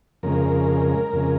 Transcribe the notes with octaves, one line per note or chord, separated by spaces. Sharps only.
F2 C#3 G#3 A#4
F2 C#3 G#3